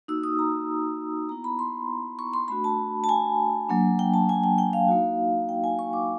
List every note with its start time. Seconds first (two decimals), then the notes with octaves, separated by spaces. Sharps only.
0.08 A#3 D#4 F#4 E6
0.24 D#6
0.39 A#5
1.29 B3 E4 A#5
1.44 B5
1.59 C6
2.19 C#6
2.33 C6
2.48 A3 D4 F#4 B5
2.64 A5
3.04 A5
3.09 G#5
3.69 F#3 A#3 D4
3.99 G5
4.14 A5
4.29 G#5
4.44 G5
4.58 G5
4.73 F5
4.88 A#3 D#4 F#4
5.49 G5
5.64 G#5
5.79 C#6
5.93 D6